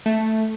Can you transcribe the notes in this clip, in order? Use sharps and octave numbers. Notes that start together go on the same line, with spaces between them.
A3